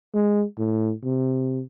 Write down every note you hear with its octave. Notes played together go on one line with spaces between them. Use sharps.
G#3
A2
C3